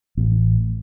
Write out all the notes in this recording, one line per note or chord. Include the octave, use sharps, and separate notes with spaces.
A1